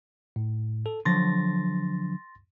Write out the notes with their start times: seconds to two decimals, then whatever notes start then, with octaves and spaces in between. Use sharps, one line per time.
0.36 A2
0.86 A4
1.05 D3 F3 F#3 C6 A6 A#6